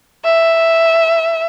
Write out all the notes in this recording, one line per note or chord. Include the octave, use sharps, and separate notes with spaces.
E5